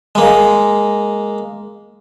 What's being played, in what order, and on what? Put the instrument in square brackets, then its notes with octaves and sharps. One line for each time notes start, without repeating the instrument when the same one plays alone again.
[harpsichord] G#3 A#3